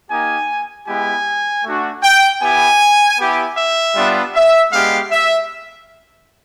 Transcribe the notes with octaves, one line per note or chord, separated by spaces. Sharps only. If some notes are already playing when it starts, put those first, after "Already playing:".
A#3 D#4 G4 G#5
G#3 B3 E4 G4 G#5
A3 D4 F#4
G5
B3 E4 G4 G#5
B3 E4 G4
E5
G3 B3 D4 F4
E5
G#3 B3 D4 G4 F5
E5